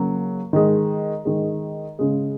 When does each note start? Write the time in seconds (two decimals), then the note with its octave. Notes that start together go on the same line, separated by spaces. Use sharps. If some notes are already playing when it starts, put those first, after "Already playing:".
Already playing: C#3 F#3 A#3
0.53 D#3 G#3
1.25 D#3 G#3
1.99 C#3 G#3